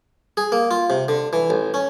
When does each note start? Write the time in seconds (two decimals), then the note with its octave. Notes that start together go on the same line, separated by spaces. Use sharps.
0.37 G#4
0.52 A#3
0.71 F4
0.90 C3
1.08 D3
1.33 E3
1.50 A1
1.74 C#4